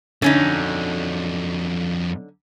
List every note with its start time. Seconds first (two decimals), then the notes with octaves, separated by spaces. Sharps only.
0.22 F2 D3 F#3 C#4 D#4